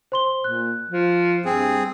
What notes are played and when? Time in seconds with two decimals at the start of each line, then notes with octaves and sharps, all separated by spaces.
0.12 C5 C6 G7
0.44 A#2 F#6
0.89 F3
1.45 G2 C4 G#4